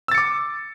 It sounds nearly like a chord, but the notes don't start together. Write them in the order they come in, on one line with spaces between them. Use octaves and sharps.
E6 A6 C#7 D6